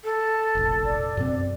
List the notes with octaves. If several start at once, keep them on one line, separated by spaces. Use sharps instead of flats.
A4
F1 A#1
D5
F#2 B2 C4